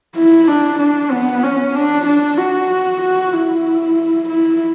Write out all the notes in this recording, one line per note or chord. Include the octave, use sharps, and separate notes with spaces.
E4
D4
D4
B3
C#4
D4
D4
F#4
F#4
E4
E4